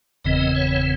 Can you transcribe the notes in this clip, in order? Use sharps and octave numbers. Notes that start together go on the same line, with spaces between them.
F#1 E2 C#3 E3 C4 D#5
C#5